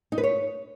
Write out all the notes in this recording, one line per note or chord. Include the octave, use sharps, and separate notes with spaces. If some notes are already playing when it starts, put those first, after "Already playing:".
D#4
B4
C#5